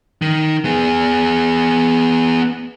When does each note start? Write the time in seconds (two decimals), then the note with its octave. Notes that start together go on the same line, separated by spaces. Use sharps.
0.22 D#3
0.65 B3 G#4